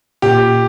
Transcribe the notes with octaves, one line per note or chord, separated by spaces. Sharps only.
A#2 G4